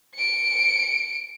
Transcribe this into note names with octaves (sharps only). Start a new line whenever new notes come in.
C#7 D7